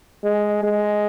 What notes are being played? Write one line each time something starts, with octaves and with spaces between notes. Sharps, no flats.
G#3
G#3